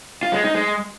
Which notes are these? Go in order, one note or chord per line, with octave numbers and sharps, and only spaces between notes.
F4
G#3
D#4
G#3